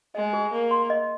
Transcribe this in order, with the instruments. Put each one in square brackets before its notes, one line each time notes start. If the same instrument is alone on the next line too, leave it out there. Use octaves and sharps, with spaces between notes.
[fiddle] G#3 [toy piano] D#5
[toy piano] G#4
[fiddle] A#3 [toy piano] G#4
[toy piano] C6
D#5